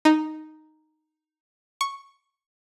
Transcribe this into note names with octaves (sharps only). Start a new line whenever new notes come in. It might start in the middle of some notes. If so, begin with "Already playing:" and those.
D#4
C#6